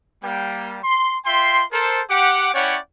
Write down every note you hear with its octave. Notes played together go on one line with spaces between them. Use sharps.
G3 A#3 G5
C6
F4 E5 G5 C6
A4 A#4 C5
G4 F#5 D6
C#4 E4 C#5 D5 F#5 G5